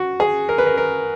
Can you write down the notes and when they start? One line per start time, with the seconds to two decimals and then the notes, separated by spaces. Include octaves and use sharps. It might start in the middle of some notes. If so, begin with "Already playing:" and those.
Already playing: F#4
0.20 G#4
0.49 A#4
0.58 B4
0.67 A#4
0.78 A#4